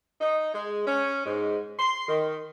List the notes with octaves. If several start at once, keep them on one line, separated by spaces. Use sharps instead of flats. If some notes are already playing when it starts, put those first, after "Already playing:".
D#4
G#3
C#4
G#2
C6
D#3